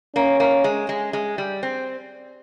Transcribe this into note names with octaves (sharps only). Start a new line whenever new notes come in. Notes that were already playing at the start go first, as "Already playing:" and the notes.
A#3 C#4
A#3
G#3
G#3
G#3
G3
C4